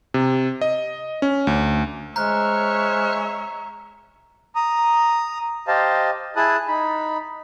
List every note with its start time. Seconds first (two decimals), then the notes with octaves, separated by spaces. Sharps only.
0.14 C3
0.61 D#5
1.22 C#4
1.47 D2
2.16 G#3 C5 C#5 E5 A#5 F6 F#6
4.55 A#5 D#6
5.68 G4 C5 D#5 F5 A5
6.36 E4 G#4 A5 D#6 F#6
6.68 D#4 B5